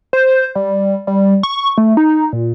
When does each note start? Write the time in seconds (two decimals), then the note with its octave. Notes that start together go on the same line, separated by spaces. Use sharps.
0.13 C5
0.56 G3
1.07 G3
1.43 C#6
1.78 A3
1.97 D#4
2.33 A#2